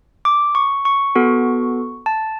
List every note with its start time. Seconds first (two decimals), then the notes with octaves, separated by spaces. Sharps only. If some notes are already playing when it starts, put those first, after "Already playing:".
0.25 D6
0.55 C#6
0.85 C#6
1.15 B3 F#4 A4
2.06 A5